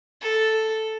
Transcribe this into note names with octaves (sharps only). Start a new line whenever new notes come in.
A4